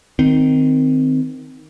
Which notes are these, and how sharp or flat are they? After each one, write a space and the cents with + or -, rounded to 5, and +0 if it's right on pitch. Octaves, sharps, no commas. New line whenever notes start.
D#3 +0 C4 -15